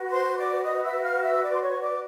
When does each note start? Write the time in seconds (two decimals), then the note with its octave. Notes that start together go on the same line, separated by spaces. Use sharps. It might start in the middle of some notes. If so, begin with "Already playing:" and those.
Already playing: F#4 B4
0.11 C5 C6
0.37 D5 D6
0.63 D#5 D#6
0.83 E5 E6
1.03 F5 F6
1.23 E5 E6
1.35 C#6
1.41 D5 D6
1.52 C6
1.61 C#5 C#6
1.81 D5 D6